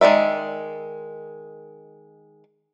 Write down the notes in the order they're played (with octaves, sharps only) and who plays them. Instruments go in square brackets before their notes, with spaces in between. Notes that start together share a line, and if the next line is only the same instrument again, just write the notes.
[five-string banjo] D#3 G#3 F#4 D5 E5